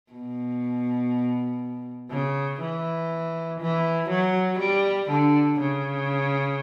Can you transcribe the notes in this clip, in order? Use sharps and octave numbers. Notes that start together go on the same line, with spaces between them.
B2
C#3
E3
E3
F#3
G3
D3
C#3